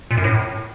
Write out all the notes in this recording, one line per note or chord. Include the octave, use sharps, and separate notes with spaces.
A#2
F#2
A2